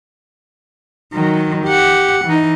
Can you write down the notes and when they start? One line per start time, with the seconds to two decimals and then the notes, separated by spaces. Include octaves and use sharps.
1.13 D#3 F#3
1.65 G4 F#5
2.25 E3 D#4